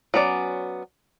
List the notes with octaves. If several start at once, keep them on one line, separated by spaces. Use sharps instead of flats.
F#3 B3 C#4 D5